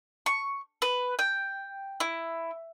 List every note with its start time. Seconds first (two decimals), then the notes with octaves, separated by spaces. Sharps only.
0.26 C#6
0.82 B4
1.19 G5
2.00 E4